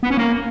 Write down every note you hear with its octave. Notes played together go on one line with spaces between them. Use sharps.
B3
C#4
A#3